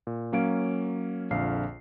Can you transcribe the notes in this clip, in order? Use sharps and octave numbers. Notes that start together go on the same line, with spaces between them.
A#2
F#3 A#3 C#4 F5 D7
A#1 F2 D3 F5 C7